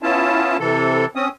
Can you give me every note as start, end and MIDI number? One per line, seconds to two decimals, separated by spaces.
0.03 0.57 59
0.03 0.57 61
0.03 0.57 64
0.03 0.57 65
0.03 0.57 81
0.60 1.05 48
0.60 1.05 52
0.60 1.05 69
1.16 1.28 60
1.16 1.28 61
1.16 1.28 87